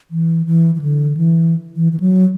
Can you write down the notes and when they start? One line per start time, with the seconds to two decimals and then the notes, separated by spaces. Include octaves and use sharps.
0.11 E3
0.46 E3
0.75 E3
0.81 D3
1.17 E3
1.76 E3
1.92 E3
2.00 F#3